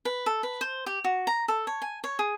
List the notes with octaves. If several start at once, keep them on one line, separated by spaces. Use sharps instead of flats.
B4
A4
B4
C5
G4
F#4
A#5
A4
C#5
G#5
C#5
G#4